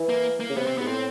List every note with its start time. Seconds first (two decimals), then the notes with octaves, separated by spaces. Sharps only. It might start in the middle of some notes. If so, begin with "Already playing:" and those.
Already playing: E3
0.09 A#3
0.40 A#3
0.49 C#3
0.56 C3 B3
0.67 C4
0.78 G#2 B3
0.87 A2 C4